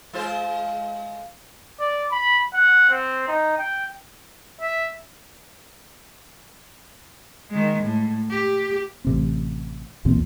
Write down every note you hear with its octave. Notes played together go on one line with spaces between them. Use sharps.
G#3 F4 C5
D5
B5
F#5
C4
D#4
G5
E5
D#3 G#3
A2
G4
A1 C3 C4
B1 E2 A#2 C4